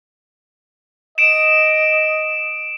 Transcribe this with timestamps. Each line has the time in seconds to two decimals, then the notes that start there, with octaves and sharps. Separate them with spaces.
1.18 D#5 D7 E7